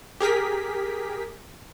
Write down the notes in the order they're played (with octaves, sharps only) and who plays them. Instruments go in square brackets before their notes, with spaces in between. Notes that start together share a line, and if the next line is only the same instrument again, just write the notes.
[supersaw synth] G4 G#4 A#4 B6